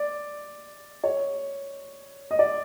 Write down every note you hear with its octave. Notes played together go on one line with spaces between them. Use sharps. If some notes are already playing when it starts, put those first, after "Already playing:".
Already playing: D5
C#5
D#5
D5